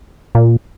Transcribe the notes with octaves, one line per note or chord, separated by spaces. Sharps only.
A#2